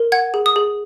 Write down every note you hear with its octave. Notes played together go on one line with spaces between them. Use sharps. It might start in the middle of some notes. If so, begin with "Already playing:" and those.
Already playing: A#4
F#5 G#6
G#4
D#6
G#4